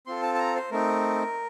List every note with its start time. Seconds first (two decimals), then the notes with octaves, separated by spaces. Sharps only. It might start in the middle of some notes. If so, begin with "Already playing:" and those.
0.07 C4 F4 A4 C6
0.22 A5
0.35 A5
0.39 A#5
0.55 C5
0.71 A3 C4 D#4 A#4